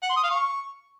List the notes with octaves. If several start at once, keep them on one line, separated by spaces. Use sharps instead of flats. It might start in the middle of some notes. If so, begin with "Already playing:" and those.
F#5
C6
D#6
F5
C#6